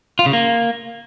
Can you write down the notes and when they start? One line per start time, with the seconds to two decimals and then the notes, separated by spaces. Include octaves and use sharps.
0.19 F4
0.26 C#3
0.33 A#3